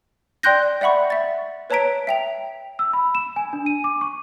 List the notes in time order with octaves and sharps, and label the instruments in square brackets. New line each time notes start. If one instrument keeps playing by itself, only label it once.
[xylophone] D5 G5 C6 F#6 G6 A#6
D5 E5 F#5 B5 C#6
E5 A6
B4 C#5 A5 A#5 B6 D7
E5 G5 F7
[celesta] E6
B5
E7
G#5
D4
D#7
D6
C#6